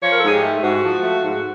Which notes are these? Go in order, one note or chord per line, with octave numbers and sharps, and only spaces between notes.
F3 C#5
A#4
A4
G#2 G#4
G4
A3
G#2 F#4
F3
A3
G#2